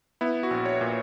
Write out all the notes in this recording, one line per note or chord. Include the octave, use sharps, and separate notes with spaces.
B3 E4
F#4
A#1
C#5
A#2